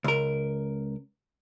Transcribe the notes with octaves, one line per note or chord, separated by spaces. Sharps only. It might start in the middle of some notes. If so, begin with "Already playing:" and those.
C#2 A#4